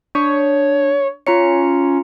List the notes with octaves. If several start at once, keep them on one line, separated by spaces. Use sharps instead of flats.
D4 C#5
C#4 F4 A#5 C#7